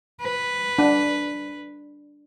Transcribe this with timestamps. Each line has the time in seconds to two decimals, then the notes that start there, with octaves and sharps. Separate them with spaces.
0.21 B4
0.79 D4